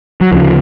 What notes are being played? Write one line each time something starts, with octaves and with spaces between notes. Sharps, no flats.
F#3
D2 C#3 F3